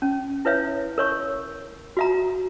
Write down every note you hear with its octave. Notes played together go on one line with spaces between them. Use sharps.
C#4
E4 B4 C#5 E5
A#4 C#5 C#6
F#4 E5 A#5